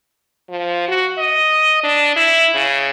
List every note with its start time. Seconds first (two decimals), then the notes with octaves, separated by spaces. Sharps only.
0.49 F3
0.88 F#4
1.18 D#5
1.83 D4
2.16 E4
2.55 C#3